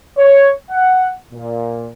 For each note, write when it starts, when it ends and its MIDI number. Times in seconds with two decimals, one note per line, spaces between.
0.17 0.50 73
0.70 1.08 78
1.33 1.89 46